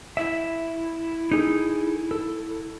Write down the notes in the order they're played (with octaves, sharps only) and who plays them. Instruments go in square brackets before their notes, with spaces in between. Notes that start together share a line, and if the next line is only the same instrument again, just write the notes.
[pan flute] E4 [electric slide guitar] E5
[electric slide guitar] D#4 G#4 A4
A4